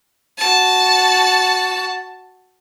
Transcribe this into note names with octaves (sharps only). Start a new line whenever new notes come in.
F#4 A5